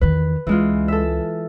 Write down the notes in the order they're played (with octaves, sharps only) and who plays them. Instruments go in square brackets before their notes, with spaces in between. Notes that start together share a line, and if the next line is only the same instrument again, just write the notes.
[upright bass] E2 D#3 [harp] B4
[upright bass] C#2 [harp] E3 G#3 F4
[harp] A4 E5